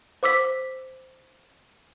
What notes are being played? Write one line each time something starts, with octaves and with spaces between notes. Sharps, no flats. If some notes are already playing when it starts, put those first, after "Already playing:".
C5 D6 E6 B6